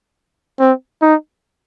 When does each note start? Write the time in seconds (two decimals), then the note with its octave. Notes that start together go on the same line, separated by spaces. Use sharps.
0.60 C4
1.02 D#4